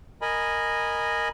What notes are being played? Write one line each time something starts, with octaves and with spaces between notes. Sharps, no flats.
A#4 D#5 G#5 B5